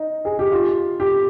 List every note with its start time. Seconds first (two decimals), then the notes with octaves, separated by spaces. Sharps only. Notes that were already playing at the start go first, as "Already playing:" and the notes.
Already playing: D#4
0.25 G#4
0.39 G4
0.52 F4
1.00 G4